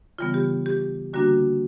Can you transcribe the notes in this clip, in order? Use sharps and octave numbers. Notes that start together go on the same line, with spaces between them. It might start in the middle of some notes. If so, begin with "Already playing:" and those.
C#3 E3 G3 B3 F4
G4
G4
D3 G3 A#3 D4 F#4